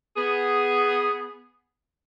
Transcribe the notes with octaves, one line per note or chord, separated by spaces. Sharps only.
B3 G#4